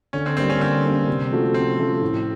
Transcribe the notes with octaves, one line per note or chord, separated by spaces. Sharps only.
D3 C#4
C4
G3 A#3 C4 C#4
C#4
D3 C4
G3 A#3 C#4
C3
F3 A3 C#4 F#4
C3 C4
F3 A3 C#4 F#4
A2